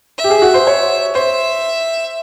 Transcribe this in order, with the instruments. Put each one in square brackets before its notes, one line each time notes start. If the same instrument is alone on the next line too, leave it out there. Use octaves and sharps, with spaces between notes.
[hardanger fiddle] E5
[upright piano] G4
G#4
F#4
C5
C#5
[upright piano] C5 [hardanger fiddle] E5